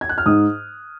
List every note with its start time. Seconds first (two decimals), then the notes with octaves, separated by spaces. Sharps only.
0.01 G#6
0.09 F#6
0.18 F6
0.26 G#2 D#6